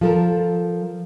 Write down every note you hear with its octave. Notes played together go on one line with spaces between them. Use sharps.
F3 A4 A#4